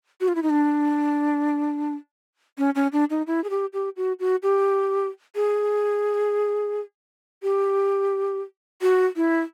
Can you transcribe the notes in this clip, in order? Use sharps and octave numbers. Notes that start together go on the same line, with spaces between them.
F#4
F4
E4
D#4
D4
C#4
C#4
D4
D#4
E4
G#4
G4
G4
F#4
F#4
G4
G#4
G4
F#4
E4